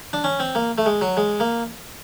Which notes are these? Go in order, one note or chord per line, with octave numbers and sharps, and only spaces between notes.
D4
C#4
C4
A#3
A3
G#3
F#3
G#3
A#3